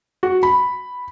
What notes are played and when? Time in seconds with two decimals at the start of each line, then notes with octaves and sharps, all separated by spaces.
0.23 F#4
0.43 B5